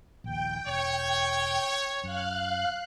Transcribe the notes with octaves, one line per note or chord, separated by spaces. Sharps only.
A#1 D#2 G5
E1 C#5
F#2 F5 F#6